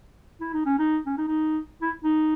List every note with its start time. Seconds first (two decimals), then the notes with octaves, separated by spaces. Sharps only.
0.41 E4
0.54 D#4
0.66 C#4
0.79 D#4
1.07 C#4
1.18 D#4
1.28 D#4
1.82 E4
2.04 D#4